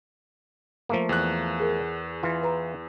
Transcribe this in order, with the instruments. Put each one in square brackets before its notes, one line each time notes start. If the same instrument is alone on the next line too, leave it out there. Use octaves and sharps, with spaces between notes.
[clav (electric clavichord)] F3 A3 A#3
[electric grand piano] E2 F#6
[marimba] G#4 A#4
[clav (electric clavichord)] E3 F4
[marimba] B4 A#5